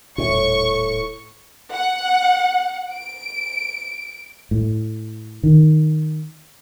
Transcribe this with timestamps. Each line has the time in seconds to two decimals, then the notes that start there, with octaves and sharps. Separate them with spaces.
0.18 D#1 A2 C#6
1.70 F#5
2.92 D7
4.51 A2
5.44 D#3